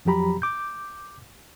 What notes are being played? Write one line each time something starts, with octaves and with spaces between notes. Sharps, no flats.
F2 F3 F#3 G4 A#5 B5
D6 G6